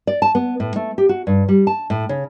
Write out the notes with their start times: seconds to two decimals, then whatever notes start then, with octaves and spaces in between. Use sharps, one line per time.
0.07 D5
0.22 A5
0.35 B3
0.60 A2
0.76 A3
0.98 G4
1.09 F#4
1.27 G2
1.49 G3
1.67 A5
1.90 A2
2.09 C#3